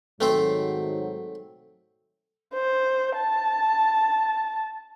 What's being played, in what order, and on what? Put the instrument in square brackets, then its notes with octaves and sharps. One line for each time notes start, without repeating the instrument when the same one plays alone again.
[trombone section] G#2 D#3 F#3 [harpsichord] A3 C4 C5
[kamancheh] C5
A5